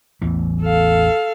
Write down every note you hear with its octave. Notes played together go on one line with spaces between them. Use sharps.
A1 E2 E3
A4 F5